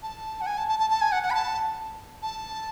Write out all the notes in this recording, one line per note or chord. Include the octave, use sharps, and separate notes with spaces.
A5
F#5
G#5
A5
A5
A5
A5
G#5
F#5
F#5
B5
A5
A5